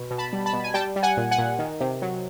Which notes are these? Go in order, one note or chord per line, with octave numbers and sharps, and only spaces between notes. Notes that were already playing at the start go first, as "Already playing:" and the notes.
Already playing: B2
B2
A5 B5
G3
A5 B5
B2
G#5
G3 G5 A5
G3
F#5 G#5
A#2
F#5 G#5
A#2
D#3
C3
F#3